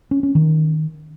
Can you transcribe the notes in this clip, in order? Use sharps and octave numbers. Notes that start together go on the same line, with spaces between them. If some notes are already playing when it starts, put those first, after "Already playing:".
C#4
C#4
D#3